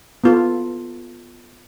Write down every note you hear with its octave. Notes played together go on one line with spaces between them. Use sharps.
B3 F4 A4